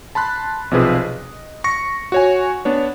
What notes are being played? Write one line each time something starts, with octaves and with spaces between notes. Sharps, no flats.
A5 B5 C6 F#6
B1 C3 F3 G#4 B4
D#5
C#6 A#6 C#7
F#4 C#5 G#5
B3 D4 C#5